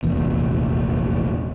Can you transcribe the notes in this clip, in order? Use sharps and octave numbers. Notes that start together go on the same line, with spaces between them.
F1 A#1 E2